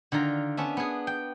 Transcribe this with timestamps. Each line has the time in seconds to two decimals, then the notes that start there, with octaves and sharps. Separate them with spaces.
0.12 D3 D#3 F4 A#5
0.57 B3 C#4 D4 E5
0.77 B3 D4 G#4
1.07 G5